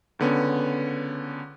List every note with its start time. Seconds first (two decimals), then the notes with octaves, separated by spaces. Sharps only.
0.19 C#2 D3 B3 C#4